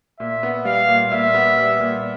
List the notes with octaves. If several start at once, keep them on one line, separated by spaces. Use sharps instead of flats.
A#2 E5
B3
G3 F5
A#2
A#2 E5
B3
G3
A#2